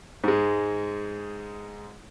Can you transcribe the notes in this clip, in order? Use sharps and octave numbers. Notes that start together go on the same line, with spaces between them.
G#2 G#3